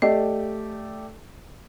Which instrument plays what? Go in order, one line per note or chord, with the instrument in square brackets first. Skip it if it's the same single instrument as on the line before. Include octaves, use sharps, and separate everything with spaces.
[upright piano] A3 G4 D5 [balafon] D#5